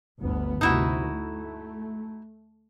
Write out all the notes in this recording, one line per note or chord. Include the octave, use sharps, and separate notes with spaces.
G1 D2 B3
D2 C3 D#4 E4 F#4
A3